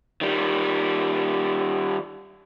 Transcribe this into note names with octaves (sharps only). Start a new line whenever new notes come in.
D#3 G3